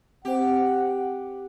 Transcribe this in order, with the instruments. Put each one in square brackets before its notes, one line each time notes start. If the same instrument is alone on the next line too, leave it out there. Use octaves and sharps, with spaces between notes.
[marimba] C4 C5 [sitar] G4 [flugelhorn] F#5